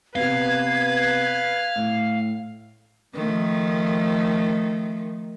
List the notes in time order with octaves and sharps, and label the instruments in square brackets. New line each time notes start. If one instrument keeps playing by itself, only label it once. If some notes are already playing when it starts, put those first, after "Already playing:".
[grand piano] C3 B3 [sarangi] B4 [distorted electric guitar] F5 [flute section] G#6
[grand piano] A2
[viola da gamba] D#3 F3 A3